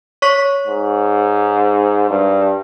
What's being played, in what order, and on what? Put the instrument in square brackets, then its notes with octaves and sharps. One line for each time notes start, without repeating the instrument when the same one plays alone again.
[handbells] C#5 C#6 B6
[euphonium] G#2
G2